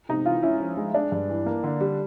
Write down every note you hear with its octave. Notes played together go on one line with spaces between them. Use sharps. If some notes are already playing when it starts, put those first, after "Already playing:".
C3 D#4
E3 F4
C#4 E4
F3
G#3
G#3 D4
G2
E3
A#3
D3
G3